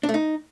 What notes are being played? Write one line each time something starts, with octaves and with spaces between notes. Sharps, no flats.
D4
A3
D#4